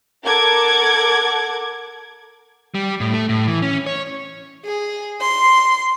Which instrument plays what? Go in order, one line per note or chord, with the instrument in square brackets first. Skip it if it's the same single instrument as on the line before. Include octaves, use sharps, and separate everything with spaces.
[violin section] A4 A#4 F#5 D6 G#6
[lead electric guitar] G3
A2
A3
A2
E3
C#4
C#5
[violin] G#4
C6